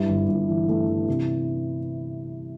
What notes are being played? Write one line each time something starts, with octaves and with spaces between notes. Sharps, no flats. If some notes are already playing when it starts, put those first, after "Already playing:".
Already playing: G2 E4
G1
G1
E3
A3
E3
C3